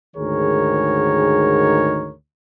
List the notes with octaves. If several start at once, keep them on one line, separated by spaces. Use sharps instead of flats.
D2 G#2 D#3 G#4 A#4 C#5